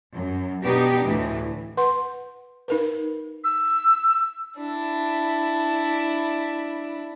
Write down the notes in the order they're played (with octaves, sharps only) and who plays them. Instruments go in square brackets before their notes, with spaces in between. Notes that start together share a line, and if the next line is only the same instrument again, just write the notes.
[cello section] F#2
B2 B3 D4 D#4 G4
D2 A2 E3
[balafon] B4 F#5 C6
D#4 A#4 B4
[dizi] E6
[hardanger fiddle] D4 E4